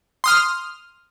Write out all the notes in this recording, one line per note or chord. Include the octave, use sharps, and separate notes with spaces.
C6 D#6 F6